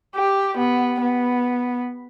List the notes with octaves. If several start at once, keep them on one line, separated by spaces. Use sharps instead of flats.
G4
B3
B3